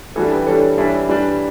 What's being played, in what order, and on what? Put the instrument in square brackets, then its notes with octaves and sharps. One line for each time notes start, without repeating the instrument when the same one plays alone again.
[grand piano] E3 G3 D4 [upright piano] F#4 A4
[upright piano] G4 B4
[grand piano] E3 G3 D4 [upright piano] A4 C#5
[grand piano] E3 G3 D4 [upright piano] C#5 E5
[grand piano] E3 G3 D4